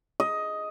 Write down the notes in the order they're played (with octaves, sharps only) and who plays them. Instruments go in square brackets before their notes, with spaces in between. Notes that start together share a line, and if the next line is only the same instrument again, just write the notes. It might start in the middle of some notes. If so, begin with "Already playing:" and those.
[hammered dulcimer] D#5